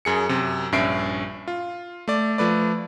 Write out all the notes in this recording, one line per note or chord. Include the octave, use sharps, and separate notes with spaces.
F#2 G#4 C#7
F#2 C3
A#1 G2 C#4 E5 C7 D7
F4
A3 D5
F3 A3 B4 D5